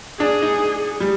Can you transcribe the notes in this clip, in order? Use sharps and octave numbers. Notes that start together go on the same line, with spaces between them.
D4 G#4
D#4
G3